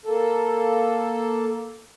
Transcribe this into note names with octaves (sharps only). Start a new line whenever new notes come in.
A#3 A4